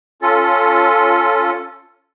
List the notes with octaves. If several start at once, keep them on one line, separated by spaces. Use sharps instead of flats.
C#4 F4 A4